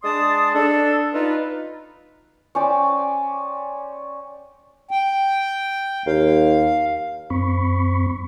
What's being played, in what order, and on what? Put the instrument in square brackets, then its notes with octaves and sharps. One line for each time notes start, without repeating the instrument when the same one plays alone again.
[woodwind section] G#3 D4 D5 A5 C6 D#6
D4 A4
D#4 F4 B4
[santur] C#4 C5 D5 G5
[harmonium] G5
[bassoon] D#2 [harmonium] F5
[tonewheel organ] F#2 C4 B5 C#6